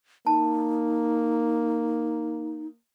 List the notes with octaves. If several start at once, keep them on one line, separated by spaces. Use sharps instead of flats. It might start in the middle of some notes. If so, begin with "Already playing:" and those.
A#3 D#4 A5